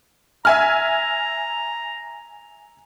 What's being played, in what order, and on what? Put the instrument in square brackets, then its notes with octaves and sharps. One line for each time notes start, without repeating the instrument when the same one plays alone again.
[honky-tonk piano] E5 G#5 F6 [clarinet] A#5